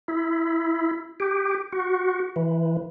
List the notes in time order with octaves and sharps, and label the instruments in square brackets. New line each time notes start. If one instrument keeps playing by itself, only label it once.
[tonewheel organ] E4
G4
F#4
E3